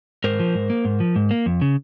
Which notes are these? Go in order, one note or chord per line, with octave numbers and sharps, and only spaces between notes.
G#2 A#4 C5
F3
G#2
A#3
G#2
F3
G#2
A#3
F2
C#3